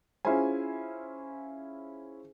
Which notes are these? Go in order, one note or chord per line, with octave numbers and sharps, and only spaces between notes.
C#4 E4 F4 G#4 C5 G#5